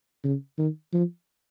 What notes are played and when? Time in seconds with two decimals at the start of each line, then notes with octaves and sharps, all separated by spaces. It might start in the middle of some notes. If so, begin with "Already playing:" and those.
0.24 C#3
0.58 D#3
0.93 F3